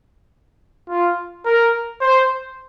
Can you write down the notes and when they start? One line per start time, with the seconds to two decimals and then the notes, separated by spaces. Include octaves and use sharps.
0.89 F4
1.45 A#4
2.01 C5